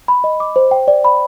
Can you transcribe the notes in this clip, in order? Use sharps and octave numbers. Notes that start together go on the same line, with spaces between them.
B5
D#5
D6
C5
G5
D5
B5